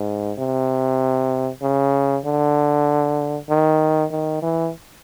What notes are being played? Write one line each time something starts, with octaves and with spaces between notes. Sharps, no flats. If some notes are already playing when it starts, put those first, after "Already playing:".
Already playing: G#2
C3
C#3
D3
D#3
D#3
E3